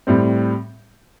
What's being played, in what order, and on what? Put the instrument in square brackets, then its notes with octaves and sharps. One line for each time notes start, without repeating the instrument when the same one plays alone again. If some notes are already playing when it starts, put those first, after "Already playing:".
[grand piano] A2 G3 C4